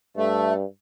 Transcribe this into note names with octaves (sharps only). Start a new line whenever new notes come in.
G2 A3